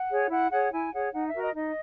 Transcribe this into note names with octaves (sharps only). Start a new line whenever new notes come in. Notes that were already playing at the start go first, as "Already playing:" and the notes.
Already playing: F#5
G#4 C#5
E4 F#5
G#4 C#5 F#5
E4 G#5
G#4 C#5 F#5
D#4 F#5
E5
F#4 A#4
D#5
D#4 D#5